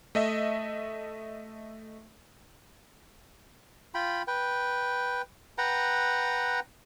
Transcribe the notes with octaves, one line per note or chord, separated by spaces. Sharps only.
A3 D#5 E5
F4 G5 B5
B4 G5
B4 F#5 G5 A#5